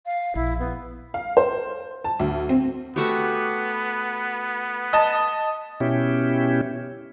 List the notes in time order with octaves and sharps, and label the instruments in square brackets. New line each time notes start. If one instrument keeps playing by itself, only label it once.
[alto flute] F5
[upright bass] A#1 [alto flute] E4
[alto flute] B3
[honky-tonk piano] F5
C5
A5
D2
C4
[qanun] A3 F#4 G4 [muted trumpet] B3
[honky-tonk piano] D#5 A5
[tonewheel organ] B2 C#4 E4 G4